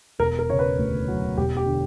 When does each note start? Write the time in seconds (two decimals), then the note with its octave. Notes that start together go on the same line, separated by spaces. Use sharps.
0.19 E1 A#4
0.39 A#4
0.49 C#3 C#5
0.59 B4
0.78 D2
1.08 F#3
1.37 E1 G4
1.57 G4
1.66 D3